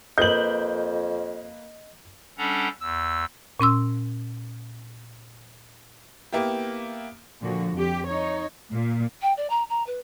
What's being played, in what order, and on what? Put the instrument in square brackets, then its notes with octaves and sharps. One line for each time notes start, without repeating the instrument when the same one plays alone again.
[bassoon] F2 [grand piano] A#3 B4 G7 [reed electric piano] D#5 [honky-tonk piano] G6 F#7
[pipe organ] G3 C#4 D4 A4 F#5 A#5
E2 E6
[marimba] A#2 C#4 C6 E6
[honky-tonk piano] A#3 B3 E4 G4
[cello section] A#2 D3 F3 F#4
F2 G4
D#4 C#5
A#2
[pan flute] G5
D5
A#5
A#5
B4